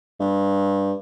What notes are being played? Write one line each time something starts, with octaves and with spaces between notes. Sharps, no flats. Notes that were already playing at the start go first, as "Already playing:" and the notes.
G2